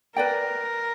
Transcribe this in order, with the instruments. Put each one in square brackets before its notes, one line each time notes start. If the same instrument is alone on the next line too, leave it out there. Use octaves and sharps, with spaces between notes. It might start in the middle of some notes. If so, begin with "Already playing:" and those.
[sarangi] A#4 [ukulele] B4 D5 G5